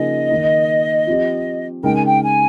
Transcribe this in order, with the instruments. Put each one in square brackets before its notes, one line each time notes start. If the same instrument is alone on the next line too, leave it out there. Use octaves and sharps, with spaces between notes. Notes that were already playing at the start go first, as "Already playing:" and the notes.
Already playing: [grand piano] C#3 F3 A#3 D#4 G#4 [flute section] D#5
[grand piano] D#3 A#3 D#4
F3 C4 G4
[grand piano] C#3 G#3 D#4 A#4 [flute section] G5
[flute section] G#5
G5
G#5